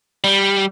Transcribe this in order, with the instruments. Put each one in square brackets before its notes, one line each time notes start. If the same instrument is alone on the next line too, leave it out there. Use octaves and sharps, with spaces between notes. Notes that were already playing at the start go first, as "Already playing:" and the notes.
[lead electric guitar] G3